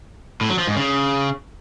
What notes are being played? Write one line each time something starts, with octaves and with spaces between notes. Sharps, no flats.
A2
F#3
F3
G#2
C#3